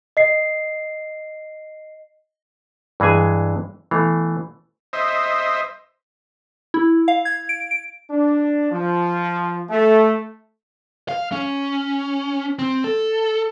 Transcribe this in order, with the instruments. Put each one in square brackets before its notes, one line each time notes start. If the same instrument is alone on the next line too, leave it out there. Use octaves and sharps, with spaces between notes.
[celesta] D#5 C7
[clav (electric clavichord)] G2 E3 G#3 G#4 G#5
B2 E3 A3 F5
[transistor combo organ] C5 D#5 E5
[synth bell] E4
F5
G#6
D7
D7
[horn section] D4
F3
A3
[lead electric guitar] F5
C#4
C4
A4